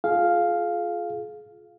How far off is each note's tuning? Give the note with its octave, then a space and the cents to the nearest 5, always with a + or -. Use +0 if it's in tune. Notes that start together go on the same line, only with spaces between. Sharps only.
F4 +0 G#4 +35 F5 +0